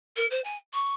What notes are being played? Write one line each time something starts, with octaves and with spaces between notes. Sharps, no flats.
A#4
C5
G#5
C#6